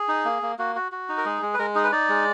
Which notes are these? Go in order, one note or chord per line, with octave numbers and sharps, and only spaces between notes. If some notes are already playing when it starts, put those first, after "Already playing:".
Already playing: G#4
D#4
A#3
A#3
A#3 F#4
F#4
F#4
D#4
A#4
G#3 G#4
G#3
B4
G#3 A#4
D#4 G#4
B4
D#4 D5
G#3